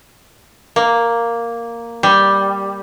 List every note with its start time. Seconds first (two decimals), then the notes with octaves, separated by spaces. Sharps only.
0.76 A#3
2.03 G3